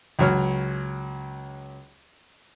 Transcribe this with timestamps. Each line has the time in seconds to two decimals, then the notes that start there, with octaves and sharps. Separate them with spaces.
0.19 C#2 F#3 C#5 F6